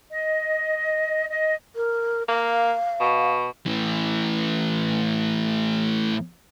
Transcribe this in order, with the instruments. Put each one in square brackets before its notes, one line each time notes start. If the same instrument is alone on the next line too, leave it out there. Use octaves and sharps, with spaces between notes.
[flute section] D#5
D#5
[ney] A#4
[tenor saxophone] A#3 [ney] F5
[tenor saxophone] B2
[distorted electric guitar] A2 E3